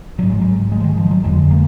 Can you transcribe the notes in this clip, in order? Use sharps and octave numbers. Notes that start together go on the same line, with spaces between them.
G#1 G#2 F#3
G#3
F#3
G#3
F3
D#3
F3
F#3
F1 F2 D3 G#3
A#3